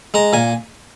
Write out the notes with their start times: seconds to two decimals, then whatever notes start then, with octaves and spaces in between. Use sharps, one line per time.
0.14 G#3 A#5
0.33 A#2 G#5